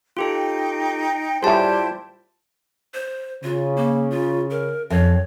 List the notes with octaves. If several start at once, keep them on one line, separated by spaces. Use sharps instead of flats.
D#4 F4 G4 A4 G5
A2 G3 E4 F4 G4 G#4 C5 A5
C5
C#3 F4
A#3
F4
A#4
F2 C#5